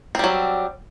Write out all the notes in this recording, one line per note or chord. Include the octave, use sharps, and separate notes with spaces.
F#3 G3 C4